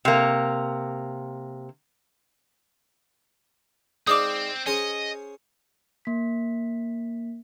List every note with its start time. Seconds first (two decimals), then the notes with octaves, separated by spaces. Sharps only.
0.05 C3 A#3
4.07 G#2 C4 D5 F5 D6 D#6
4.66 C#4 G#4 C5 D#5
6.05 A#3 B6